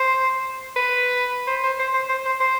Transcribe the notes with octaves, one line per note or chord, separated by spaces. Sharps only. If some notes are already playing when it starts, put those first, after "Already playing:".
Already playing: C5
B4
C5
C5
C5
C5
C5
C5
C5